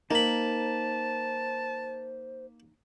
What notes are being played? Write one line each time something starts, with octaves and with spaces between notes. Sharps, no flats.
A#3 D#4 A#4 C5 A5 B5